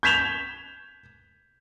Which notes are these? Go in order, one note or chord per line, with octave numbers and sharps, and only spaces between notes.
G6 G#6 B6 E7 F7 G7